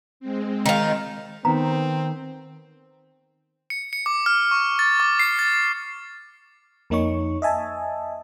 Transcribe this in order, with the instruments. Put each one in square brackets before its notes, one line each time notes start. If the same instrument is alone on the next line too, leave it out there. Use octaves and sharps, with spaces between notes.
[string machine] G#3 C4
[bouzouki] D#3 F4
[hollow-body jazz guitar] D#3 B3 [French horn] C4 [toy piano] A#5
[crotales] C#7
C#7
D6
F6
C#6
A6
D6
C7
A6
[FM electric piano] F2 A#3 D#4 C#5 C#6
D#5 E5 G#5 A5